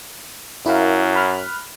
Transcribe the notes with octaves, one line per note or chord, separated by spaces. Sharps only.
F#2 E4 A#4 F5
B5 F6 F#6